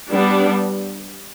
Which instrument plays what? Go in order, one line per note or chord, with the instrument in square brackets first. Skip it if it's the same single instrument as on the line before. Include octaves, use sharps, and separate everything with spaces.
[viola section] G3 B3 D4